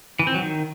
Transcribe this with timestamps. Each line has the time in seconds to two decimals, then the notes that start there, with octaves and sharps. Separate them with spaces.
0.19 E3
0.27 C4
0.35 F#3
0.42 D#3